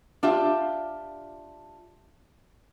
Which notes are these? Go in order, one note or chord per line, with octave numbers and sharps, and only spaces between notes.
D4 F4 G4 E5